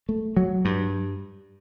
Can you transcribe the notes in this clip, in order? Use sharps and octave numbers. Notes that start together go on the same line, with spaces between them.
A3
F#3
G2